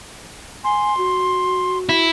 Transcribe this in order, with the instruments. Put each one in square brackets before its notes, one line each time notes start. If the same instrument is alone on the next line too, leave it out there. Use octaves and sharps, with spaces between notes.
[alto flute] G#5 [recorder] C6
[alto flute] F#4
[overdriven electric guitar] E4